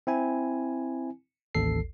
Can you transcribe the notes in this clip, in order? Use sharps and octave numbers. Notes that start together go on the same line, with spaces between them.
C4 E4 G#5
A1 D#2 A4 C7